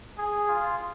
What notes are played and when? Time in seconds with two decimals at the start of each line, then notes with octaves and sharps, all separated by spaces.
0.18 G#4
0.49 F4